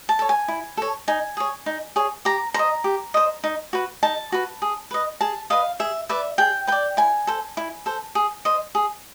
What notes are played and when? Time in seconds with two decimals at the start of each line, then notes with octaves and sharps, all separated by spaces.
0.09 A5
0.19 A4 C#5
0.29 G#5
0.48 E4
0.77 A4 C#5
1.08 D#4 G#5
1.37 G#4 C#5
1.66 D#4
1.96 G#4 C#5
2.25 G4 A#5
2.54 C5 D#5 A#5
2.84 G4
3.14 C5 D#5
3.44 D#4
3.73 F#4 B4
4.03 D#4 A5
4.32 F#4 B4
4.62 G#4
4.91 B4 D#5
5.21 G#4 A5
5.50 B4 D#5 F5
5.80 G#4 E5
6.09 B4 D5 E5
6.38 G#4 G5
6.67 B4 D5 G5
6.97 E4 G#5
7.27 A4 C5
7.57 E4
7.86 A4 C5
8.15 G#4
8.45 C5 D#5
8.75 G#4